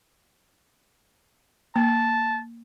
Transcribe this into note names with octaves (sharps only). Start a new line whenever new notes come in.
A#3 A5